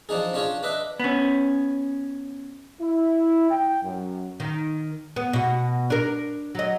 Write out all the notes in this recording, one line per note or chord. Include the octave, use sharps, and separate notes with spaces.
F3 D4 D#4 G#4
C#4 D4 F4 G#4 C#5
D4 B4 D#5 E5
B3 C#4
E4
G5
F#2
D#3
B3
B2 F#4
D4 A#4
F#3 D#5